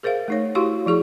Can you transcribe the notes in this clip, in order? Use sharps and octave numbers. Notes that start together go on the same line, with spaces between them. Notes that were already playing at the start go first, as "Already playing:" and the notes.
G#4 A#4 C5 E5 F5
A3 D#4 C#5
E4 F#4 G4 F5 C6
F3 E4 G#4 C#6